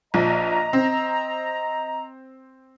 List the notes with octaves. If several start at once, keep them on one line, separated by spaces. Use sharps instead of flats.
A#1 F3 D#5 A#5
C4